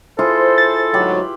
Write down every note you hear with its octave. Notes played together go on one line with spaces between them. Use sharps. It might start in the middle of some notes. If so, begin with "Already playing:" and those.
E4 F4 G#4 A4 C5
A6
D2 G#2 F#3 G4 B4 B5